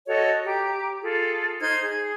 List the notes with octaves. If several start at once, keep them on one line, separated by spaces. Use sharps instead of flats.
F#4 A4 C#5 D#5
G4 A#5
F4 G#4 A4
D#4 C5 F6 G#6
G#4